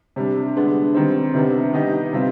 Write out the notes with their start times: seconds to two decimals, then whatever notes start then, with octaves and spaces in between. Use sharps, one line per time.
0.16 C3 G3 D4
0.56 D3 G#3 B3 D4
0.95 D#3 G3 C4
1.34 C3 D#3 G3 B3 D4
1.72 D#3 B3 D#4 G4
2.13 C3 G3 C4 F4